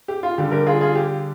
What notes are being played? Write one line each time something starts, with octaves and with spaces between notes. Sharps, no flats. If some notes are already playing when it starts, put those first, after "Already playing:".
G4
F4
D3 G3 G4
G4 A#4
F4 G#4
F4 G#4
G4